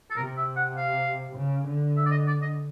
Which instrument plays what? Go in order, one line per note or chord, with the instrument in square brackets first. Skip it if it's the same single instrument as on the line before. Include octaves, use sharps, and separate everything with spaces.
[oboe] A4
[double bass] C3 [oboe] A#4
[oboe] E5
F#5
F5
[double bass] C#3
D3
[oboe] E5
D5
D#5
D5
D#5